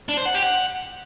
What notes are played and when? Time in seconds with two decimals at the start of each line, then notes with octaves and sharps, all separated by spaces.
0.09 D4
0.17 C5
0.26 F#5
0.34 G4
0.43 F#5